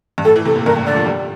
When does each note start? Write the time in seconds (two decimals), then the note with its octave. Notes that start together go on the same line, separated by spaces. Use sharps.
0.18 G2
0.25 A2 A4
0.36 E3
0.45 C3 A4
0.55 A#2
0.66 G2 A#4
0.76 A2
0.86 D3 D5
0.96 F3
1.06 G3